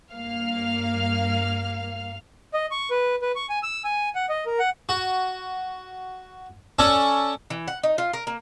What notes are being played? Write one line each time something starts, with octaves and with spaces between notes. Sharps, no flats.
G2 A#3 F5 F6
D#5
C#6
B4
B4
C#6
G#5
E6
G#5
F#5
D#5
A#4
F#5
F#4
C#4 A4 C#5 D5
E3
F#5
D#4
F4
A#4
A#3